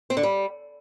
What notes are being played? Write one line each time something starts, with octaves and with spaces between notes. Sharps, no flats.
C4
D3
G3